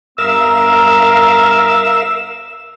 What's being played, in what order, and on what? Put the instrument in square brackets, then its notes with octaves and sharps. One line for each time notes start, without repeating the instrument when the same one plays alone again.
[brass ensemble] G2 B3 A#5 [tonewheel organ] A#4 E5 F5 [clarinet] E6